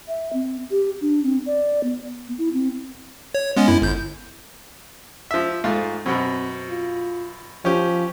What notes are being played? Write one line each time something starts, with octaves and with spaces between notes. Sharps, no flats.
E5
C4
G4
D4
C4
D5
B3
E4
C4
C#5
G#3 B3 C#4
F#2 E4
G1 G6
F3 E5
G#2 A3 F4
F#2 B2 C4
F4
F3 C#4 G4